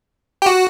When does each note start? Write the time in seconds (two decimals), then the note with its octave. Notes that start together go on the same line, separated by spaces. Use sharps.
0.42 G4
0.46 F#4